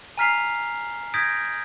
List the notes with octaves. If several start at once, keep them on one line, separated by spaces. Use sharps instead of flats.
G#5 A#5 F6 B6 C7 F7
D#6 G6 G#6 A#6 B6 D7